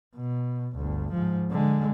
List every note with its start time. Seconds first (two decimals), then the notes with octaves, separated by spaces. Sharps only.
0.16 B2
0.76 G1 D2
1.12 G#2 F3
1.51 D3 G#3